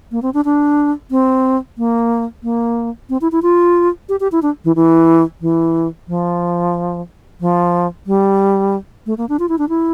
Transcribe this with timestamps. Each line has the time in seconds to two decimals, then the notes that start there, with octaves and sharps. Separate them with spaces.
0.12 A#3
0.22 C4
0.34 D4
0.45 D4
1.11 C4
1.78 A#3
2.43 A#3
3.10 C4
3.21 E4
3.32 E4
3.42 F4
4.09 G4
4.20 G4
4.32 E4
4.43 D4
4.64 E3
4.76 E3
5.41 E3
6.08 F3
7.41 F3
8.07 G3
9.06 A3
9.18 A#3
9.29 D4
9.39 F4
9.49 E4
9.58 D4
9.69 E4